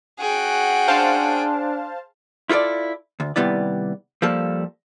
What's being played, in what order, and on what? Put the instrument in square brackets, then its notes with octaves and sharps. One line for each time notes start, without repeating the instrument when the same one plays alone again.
[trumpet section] C#4 F#4 F#5 [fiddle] G#4 G5
[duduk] D4 [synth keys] C5 F5 A5
[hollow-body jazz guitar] E4 F4 A4 A#4 D5
D2
D#2 C3 G3 B3 E4 D5
F3 G3 A#3 A4